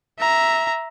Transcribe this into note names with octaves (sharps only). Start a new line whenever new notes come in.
E5 A#5